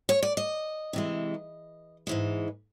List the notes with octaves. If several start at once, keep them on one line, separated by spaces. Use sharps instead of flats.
C#5
D5
D#5
C3 E3 G#3
G#2 E3 G#3